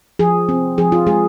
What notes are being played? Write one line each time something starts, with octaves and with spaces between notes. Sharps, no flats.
F3 G#4
C4
F3 G#4
F4
G#3 G#4